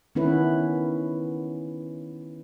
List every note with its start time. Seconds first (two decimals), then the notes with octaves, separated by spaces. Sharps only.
0.15 D#3 B3 C#4 E4 B4